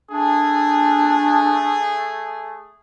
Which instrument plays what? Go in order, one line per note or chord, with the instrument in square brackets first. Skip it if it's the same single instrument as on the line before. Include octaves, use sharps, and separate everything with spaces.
[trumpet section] A3 G#4 [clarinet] D4